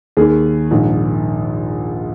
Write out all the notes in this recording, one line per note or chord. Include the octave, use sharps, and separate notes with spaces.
D#2 D#3 G#4
A#1 G#2 D#3